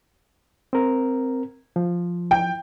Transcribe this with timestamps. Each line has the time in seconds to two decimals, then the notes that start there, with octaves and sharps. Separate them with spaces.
0.73 C4 A#4
1.76 F3
2.31 G5